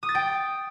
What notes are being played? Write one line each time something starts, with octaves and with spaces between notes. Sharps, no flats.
D#6
A6
G5